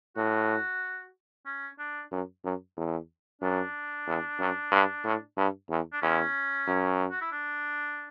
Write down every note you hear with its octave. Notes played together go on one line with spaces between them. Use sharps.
A2 F#4
C#4
D4
F#2
F#2
E2
F#2 D4
E2
F#2
G2
A2
G2
E2
D4
E2 C#4
F#2
F#4
E4
D4